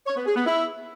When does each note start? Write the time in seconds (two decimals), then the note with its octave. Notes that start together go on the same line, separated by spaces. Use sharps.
0.07 C#5
0.16 B3
0.26 G#4
0.36 B3
0.46 E4